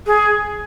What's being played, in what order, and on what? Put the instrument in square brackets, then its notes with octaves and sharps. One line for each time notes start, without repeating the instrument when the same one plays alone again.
[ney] G#4